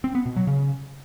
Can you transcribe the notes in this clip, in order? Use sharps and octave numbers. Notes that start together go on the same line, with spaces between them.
C4
B3
B2
F#3
C#3